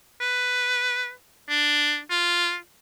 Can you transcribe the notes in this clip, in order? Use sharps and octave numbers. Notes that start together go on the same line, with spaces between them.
B4
D4
F4